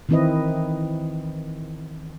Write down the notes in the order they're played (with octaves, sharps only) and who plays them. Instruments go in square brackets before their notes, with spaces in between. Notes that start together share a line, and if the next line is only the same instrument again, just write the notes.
[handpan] D#3 E3 C4 E4 B4 D#5